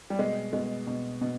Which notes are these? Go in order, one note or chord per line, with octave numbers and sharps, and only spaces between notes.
G3
B2 G#3
B2 G#3
B2
B2